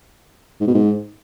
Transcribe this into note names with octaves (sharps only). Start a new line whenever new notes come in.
G#2
B2
G#2